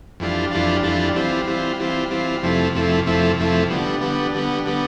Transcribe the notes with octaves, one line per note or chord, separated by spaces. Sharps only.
F2 E3 G3 D4 F4
F2 E3 G3 D4 F4
F2 E3 G3 D4 F4
E3 G3 C4 F4
E3 G3 C4 F4
E3 G3 C4 F4
E3 G3 C4 F4
F2 C3 F3 A3 E4
F2 C3 F3 A3 E4
F2 C3 F3 A3 E4
F2 C3 F3 A3 E4
D3 G3 B3
D3 G3 B3
D3 G3 B3
D3 G3 B3